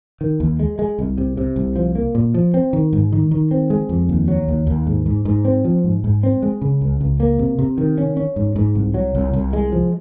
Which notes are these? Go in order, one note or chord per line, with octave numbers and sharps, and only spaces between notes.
D#3
D#2
G#3
G#3
C2
C3
C3
C2
F3
A#3
A#2
F3
C4
D#3
G#2
D#3
D#3
C4
G#3
F2
D#2
F#3
D#2
D#2
G#2
G#2
G#2
C4
F3
G#2
G#2
C4
G#3
C#3
C#2
C#2
A#3
C3
C3
D#3
C#4
C#4
G#2
G#2
C2
F#3
C2
C2
G#3
F3